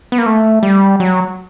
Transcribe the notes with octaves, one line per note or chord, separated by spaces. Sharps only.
B3
A#3
A3
G3
F#3